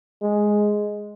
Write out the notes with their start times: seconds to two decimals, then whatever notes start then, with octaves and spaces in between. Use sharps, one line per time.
0.22 G#3